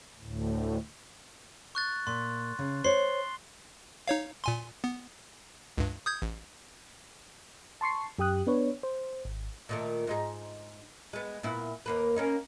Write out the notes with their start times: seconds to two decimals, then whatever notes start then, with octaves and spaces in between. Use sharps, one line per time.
0.20 D2 A2
1.75 C#6 F#6 A6
2.07 A#2 C6
2.59 C#3
2.84 C5 C#5 C6 C7 G7
4.08 D#4 C#5 F5
4.44 A#2 G#5 C6
4.84 B3
5.78 C#2 G2
6.06 D#6 G6 G#6
6.22 A1
7.81 A5 C6 C#6 C7
8.18 F#2 G4 G5 D#6 F#6
8.47 B3 D4 B4 C#5
8.83 C5
9.25 G#1
9.69 A#2 D#3 A3
10.07 G#2 D#4 G#4
11.13 G#3 B3
11.43 A#2 B3 E4
11.86 D#2 A#3 B4
12.16 A#3 C#4 D#4